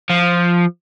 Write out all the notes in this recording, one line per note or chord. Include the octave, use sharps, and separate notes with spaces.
F3